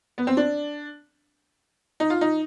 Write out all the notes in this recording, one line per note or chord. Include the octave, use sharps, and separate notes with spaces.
B3
C4
D4
D#4
F4
D#4